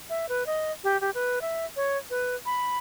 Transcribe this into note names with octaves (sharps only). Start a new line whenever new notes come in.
E5
B4
D#5
G4
G4
B4
E5
C#5
B4
B5